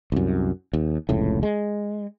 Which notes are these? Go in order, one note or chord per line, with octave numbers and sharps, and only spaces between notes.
C2 F#2
D#2
F1 C#2 A2
G#3